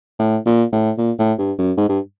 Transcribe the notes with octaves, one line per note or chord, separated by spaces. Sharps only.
A2
A#2
A2
A#2
A2
G2
F#2
G#2
G2